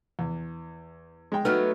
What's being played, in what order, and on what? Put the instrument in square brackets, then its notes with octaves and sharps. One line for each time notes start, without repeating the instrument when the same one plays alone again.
[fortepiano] E2
G#3 G5
[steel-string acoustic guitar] F#3 A3 B3 [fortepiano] D#4 F6